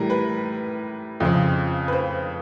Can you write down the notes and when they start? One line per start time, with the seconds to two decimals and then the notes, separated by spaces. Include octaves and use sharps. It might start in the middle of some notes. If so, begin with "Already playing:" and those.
Already playing: A2 E3 G3 A#4
0.10 B4
1.20 F2 C#3 F3
1.88 B4
1.93 C5